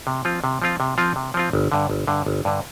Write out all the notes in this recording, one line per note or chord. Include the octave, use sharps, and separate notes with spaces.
C3
F3 C4 F4
C3
F3 C4 F4
C3
F3 C4 F4
C3
F3 C4 F4
G1
G2 D3
G1
G2 D3
G1
G2 D3